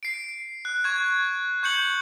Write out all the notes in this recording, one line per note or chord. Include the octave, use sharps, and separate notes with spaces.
C7 D7
F#6
C#6 G#6
C#6 G6 C#7 F#7